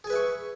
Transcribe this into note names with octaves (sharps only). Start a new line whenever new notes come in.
G#4 B4 E5 G#5 C#6